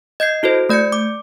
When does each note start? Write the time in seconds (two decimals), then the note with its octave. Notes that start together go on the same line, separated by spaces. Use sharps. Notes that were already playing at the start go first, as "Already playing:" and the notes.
0.20 D#5 G6 G#6 C7
0.43 E4 F#4 A4 C5
0.69 A3 D5 G6 G#6 C#7
0.92 D6